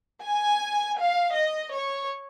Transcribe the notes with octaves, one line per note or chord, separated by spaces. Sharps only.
G#5
F5
D#5
C#5